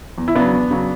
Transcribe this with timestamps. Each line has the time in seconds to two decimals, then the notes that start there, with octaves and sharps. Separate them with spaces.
0.18 E2
0.28 E4
0.35 C#3 F#3 B3 D4
0.53 E2
0.71 C#3 F#3